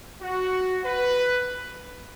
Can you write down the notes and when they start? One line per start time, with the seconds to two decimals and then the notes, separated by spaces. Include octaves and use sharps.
0.22 F#4
0.85 B4